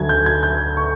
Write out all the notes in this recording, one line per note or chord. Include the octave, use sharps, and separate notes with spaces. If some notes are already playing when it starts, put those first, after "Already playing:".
Already playing: D2 D3 F#3 A3 G#6
G6
G#6
G6
C#6